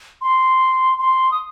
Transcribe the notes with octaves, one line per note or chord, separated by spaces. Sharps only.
C6
C6
D#6